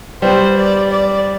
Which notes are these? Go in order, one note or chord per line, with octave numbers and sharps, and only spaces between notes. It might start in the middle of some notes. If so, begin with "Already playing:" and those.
G3 B3 C5
D5
D5